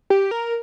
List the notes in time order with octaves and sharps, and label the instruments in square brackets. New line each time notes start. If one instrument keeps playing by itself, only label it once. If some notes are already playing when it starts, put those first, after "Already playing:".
[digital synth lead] G4
A#4